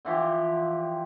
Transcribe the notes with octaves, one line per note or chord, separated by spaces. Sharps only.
D3 E3 F3 G4